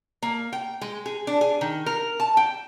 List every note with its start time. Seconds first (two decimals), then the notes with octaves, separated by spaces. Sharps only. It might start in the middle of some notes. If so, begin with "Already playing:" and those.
0.22 A#3
0.53 G5
0.81 G#3
1.06 G#4
1.27 D4
1.41 G#4
1.61 D#3
1.86 A#4
2.20 A5
2.37 G5